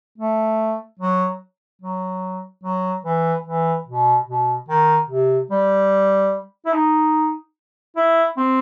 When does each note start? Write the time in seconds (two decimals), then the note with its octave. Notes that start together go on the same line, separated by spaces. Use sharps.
0.18 A3
1.00 F#3
1.82 F#3
2.64 F#3
3.05 E3
3.46 E3
3.87 B2
4.28 B2
4.69 D#3
5.10 C3
5.51 G3
6.66 E4
6.74 D#4
7.97 E4
8.37 C4